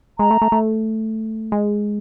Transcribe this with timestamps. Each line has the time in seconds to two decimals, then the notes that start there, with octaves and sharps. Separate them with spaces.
0.19 G#3 A#5
0.31 A3
0.42 A3
0.52 A3
1.52 G#3